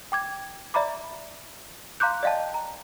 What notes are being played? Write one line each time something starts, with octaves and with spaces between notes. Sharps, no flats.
G5 D6 G#6
D5 E5 A#5 B5 D6
F5 A#5 C6 D6 F#6 G6
D5 D#5 F5 G5 A5
A#5